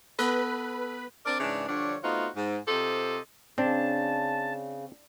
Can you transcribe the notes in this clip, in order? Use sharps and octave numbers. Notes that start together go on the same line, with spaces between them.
B3 A4 B4 B5
C4 D4 A#4 D5
G#2 C#3 E3 D4
D3 F3 G3 D4 C#5
A3 B3 C4 D#4 F4 F#4
G#2
C3 F4 G4 A4 C5 D#5
C#3 C4 D4 A5